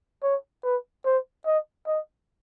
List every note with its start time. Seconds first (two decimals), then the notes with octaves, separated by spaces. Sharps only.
0.23 C#5
0.64 B4
1.05 C5
1.46 D#5
1.87 D#5